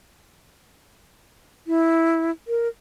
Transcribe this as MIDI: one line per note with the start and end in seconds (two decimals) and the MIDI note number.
1.67 2.31 64
2.48 2.68 70